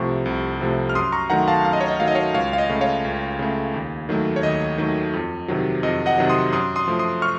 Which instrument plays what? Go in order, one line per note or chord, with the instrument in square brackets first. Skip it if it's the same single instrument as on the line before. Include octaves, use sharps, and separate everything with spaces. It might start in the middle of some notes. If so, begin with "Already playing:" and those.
Already playing: [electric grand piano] C2 C3 F3 A3 C#6
C2
C3 F3 A3
F6
F#2 C6 D#6
A#5 C#6
D#3 F#3 A3 F#5 A#5
F5 A5
F#2 F5
D#5
C#5
D#5
D#3 F#3 A3 F5
D#5
C#5 F5
C#2 C#5 F5
F5
D#5
C#3 A3
C#5 F5
C#2
C#3 A3
D#2
D#3 F#3 A3
C#5
D#2 D#5
D#3 F#3 A3
F2
C3 D#3 F#3
F2 D#5
D#5 F#5
C3 D#3 F#3
C6 D#6
F#2 C6 D#6
C6 D#6
F3 A3
C6 D#6
C#6 F6